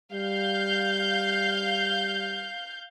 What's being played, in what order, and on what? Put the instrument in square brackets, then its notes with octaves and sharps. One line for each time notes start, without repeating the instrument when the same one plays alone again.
[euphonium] G3 [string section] F5 G6